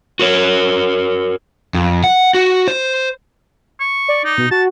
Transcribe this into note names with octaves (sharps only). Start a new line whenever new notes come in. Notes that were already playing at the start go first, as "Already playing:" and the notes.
F#4 A#4 C#5
F2
F#5
F#4
C5
C#6
D5
D#4
B2
F#4 A5